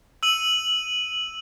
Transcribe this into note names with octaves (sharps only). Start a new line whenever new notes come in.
E6 D#7 F#7